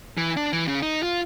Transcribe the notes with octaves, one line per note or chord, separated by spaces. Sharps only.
E3
D4
E3
C#3
D#4
F4